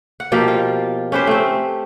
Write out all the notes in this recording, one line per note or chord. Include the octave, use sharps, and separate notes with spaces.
F#5
B2 F3 A#3 G4
F4
C#4 G4 B4 C5
A3 C4